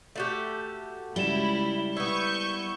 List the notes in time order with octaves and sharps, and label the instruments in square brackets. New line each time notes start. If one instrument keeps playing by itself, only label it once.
[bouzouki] A3 F#4 G4
[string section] C#2 E4 [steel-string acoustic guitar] G3 [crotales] E7 G7
[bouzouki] B3 E4 [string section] C#6 G6